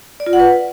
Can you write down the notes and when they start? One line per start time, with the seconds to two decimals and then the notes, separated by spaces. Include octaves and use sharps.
0.20 D5
0.26 F4
0.33 F#5
0.40 B4